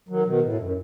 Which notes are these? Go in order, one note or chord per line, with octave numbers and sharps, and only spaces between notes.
D#3 F#3
B2 D#3
A2
G2
F#2